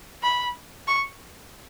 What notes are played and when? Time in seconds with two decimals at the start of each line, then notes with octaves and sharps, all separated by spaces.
0.23 B5
0.88 C#6